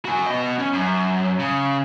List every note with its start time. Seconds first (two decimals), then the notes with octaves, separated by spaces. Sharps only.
0.05 F#4 G#5
0.26 B3 D#5
0.58 C#4
0.73 F#2
1.39 C#3